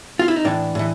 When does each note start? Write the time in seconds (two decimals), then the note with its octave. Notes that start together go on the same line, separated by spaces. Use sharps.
0.19 F4
0.28 E4
0.36 D#4
0.45 A2 E3 D4
0.75 A2 E3